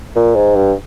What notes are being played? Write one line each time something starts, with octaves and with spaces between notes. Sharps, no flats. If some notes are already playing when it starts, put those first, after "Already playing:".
A#2
G#2
G2